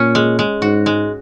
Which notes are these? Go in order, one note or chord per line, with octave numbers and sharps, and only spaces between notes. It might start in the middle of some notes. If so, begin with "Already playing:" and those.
Already playing: A#2 C#4
G#3
G#3
G#2 F#4
G#3